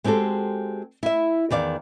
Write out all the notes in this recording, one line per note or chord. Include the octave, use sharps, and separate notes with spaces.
G#3 C4 F#4 G4 A4
E4 E5
E2 D#3 D5 F5